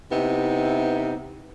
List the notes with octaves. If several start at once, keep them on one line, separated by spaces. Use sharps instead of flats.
C3 B3 D#4 E4